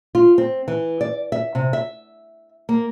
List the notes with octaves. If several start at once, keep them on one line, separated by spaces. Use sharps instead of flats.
F4
C4
E3
D5
E5
C3
E5
A#3